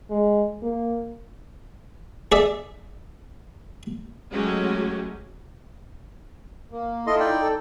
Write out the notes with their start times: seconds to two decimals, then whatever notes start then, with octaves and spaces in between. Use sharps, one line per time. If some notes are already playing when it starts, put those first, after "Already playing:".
0.11 G#3
0.62 A#3
2.32 G#4 D5 E5
4.32 F#3 G#3 A3 C#4 F#4 G4
6.72 A#3
7.07 E4 F4 A4 D#5 C6
7.20 D#4 D5 G5
7.42 A4